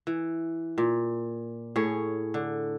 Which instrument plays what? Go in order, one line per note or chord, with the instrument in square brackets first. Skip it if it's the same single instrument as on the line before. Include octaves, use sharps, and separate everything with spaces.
[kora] E3
A#2
A2 G#4 C#5
D3